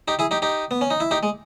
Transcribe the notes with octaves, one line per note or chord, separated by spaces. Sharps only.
D#4 G4
E4 G#4
D#4 G4
D#4 G4
B3
C#4
D#4
E4
D#4 G4
G#3